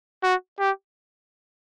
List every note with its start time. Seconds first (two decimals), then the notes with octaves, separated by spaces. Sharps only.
0.23 F#4
0.59 G4